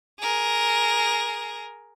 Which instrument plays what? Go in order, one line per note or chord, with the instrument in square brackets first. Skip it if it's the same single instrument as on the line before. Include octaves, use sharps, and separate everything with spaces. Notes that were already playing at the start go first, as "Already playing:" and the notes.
[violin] G#4 A#4